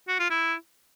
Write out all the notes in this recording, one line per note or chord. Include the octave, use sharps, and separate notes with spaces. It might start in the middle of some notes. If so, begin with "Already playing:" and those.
F#4
F4
E4